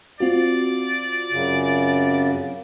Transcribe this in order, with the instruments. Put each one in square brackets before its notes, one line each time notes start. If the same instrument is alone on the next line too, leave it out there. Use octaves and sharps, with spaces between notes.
[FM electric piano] C4 F4 F#4 [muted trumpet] D5
[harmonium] F#2 C#3